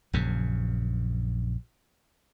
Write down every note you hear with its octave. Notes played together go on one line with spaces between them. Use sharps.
A#1 F#2 C#3